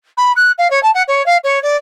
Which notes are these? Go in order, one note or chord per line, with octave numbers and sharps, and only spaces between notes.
B5
F#6
F5
C#5
A5
F#5
C#5
F5
C#5
D5